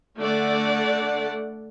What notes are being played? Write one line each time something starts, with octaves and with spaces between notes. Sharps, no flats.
D3 A3 D5 F#5